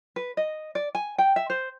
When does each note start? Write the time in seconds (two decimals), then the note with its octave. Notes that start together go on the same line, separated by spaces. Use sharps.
0.16 B4
0.37 D#5
0.75 D5
0.95 G#5
1.18 G5
1.36 E5
1.50 C5